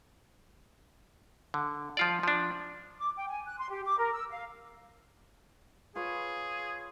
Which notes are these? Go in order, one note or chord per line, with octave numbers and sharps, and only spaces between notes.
D3
F3 F4 D5
F3 D4
D6
G5
G#5
F#6
C6
G4
D6
A#4
E6
F5
F4 G#4 B4 C#5